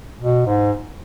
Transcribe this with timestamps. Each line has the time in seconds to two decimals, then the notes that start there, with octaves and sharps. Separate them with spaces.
0.21 B2
0.47 G#2